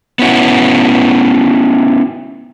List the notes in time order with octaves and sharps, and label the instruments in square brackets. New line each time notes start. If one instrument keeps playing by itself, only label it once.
[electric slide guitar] B3 C#4 E4 F#4